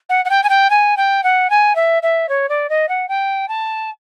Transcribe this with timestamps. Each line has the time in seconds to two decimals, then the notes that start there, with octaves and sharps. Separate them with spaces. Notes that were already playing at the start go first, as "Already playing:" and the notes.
0.09 F#5
0.25 F#5
0.30 G5
0.43 G#5
0.49 G5
0.70 G#5
0.97 G5
1.23 F#5
1.50 G#5
1.75 E5
2.02 E5
2.29 C#5
2.49 D5
2.69 D#5
2.89 F#5
3.08 G5
3.48 A5